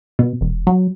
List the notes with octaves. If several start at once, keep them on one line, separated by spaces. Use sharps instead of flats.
B2
E1
F#3